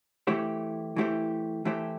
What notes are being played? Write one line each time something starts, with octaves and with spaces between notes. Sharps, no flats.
E3 A3 E4 G4 C5
E3 A3 E4 G4 C5
E3 A3 E4 G4 C5